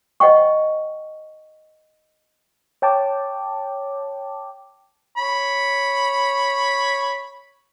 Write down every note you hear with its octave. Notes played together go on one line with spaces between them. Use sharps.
C5 D#5 F#5 G5 C#6
C#5 G5 A5 D6
C#5 B5